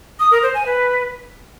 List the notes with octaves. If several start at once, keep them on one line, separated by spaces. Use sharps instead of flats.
D#6
A#4
C5
G#5
B4